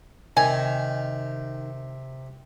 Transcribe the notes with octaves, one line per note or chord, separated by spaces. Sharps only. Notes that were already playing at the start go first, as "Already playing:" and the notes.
C3 D#3 G#5